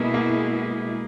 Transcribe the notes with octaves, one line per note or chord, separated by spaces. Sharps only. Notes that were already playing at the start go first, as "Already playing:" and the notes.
Already playing: B2 G#3 A#3 B3 E4 G#4
A#3